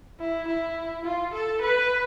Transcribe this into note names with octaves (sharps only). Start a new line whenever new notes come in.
E4
E4
F4
A4
B4